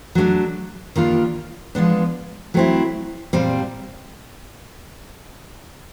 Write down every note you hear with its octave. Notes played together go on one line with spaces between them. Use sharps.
F#3 A3 D4
D#3 G3 A#3 D4 F4
F3 G#3 B3 D4
F#3 A3 C4 E4
A#2 G3 C4